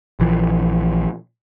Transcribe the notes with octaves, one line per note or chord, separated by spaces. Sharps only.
A#1 E3 F3